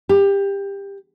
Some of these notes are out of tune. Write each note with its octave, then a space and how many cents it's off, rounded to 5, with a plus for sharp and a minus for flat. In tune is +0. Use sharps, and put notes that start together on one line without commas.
G4 +20